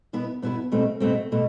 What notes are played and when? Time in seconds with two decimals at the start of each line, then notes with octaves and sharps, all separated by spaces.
0.13 B2 B3 E4 B4
0.42 B2 B3 E4 B4
0.72 B2 A3 C4
1.00 B2 A3 C4
1.32 B2 A3